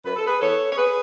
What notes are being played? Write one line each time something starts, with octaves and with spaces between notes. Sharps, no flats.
F#2 B4
A4
G#4 B4
E3 B3 A4 C#5
C#5
G#4 B4